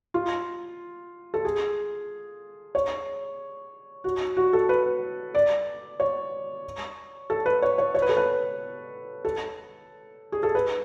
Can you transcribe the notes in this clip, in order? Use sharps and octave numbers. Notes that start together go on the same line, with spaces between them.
F4
A4
G#4
C#5
F#4
F#4
A4
B4
D5
C#5
A4
B4
C#5
C#5
C#5
B4
A4
B4
A4
G#4
A4
B4